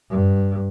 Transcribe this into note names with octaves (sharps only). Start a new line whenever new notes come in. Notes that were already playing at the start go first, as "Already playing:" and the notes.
G2